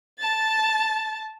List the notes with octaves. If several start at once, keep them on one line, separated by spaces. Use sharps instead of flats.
A5 A6